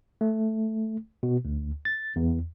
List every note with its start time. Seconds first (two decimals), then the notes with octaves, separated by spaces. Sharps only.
0.21 A3
1.23 B2
1.45 D2
1.85 A6
2.16 E2